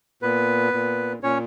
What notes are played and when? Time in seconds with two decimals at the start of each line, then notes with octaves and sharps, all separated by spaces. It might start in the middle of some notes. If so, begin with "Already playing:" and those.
0.22 A#2 B3 B4
0.73 A#2
1.23 A#2 C#4 C#5